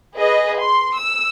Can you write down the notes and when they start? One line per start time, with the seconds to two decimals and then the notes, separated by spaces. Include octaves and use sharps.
0.16 G#4 B4 D#5
0.60 C6
0.98 E6